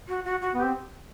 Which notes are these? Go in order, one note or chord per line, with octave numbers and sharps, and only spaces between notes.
F#4
F#4
F#4
B3 G4
C4